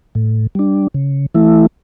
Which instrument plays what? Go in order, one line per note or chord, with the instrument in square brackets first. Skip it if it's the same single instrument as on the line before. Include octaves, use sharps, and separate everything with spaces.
[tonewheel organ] A2
G3 D4
C#3
E3 A3 E4